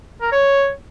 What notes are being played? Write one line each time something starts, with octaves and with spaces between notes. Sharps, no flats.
A#4
C#5